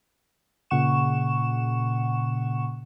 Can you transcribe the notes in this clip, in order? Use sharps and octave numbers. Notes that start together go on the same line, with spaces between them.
A#2 C#3 F#5 C#6 E7